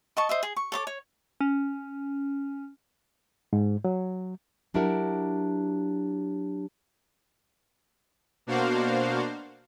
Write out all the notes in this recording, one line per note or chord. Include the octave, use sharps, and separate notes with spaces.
D#5 A5 C#6
C5 D#5 E5
G#4
C#6
A4 C#5 D6
C#5
C#4
G#2
F#3
F#3 D4 E4 G4 A#4 F#5
B2 A#3 D4 F#4 C5 F5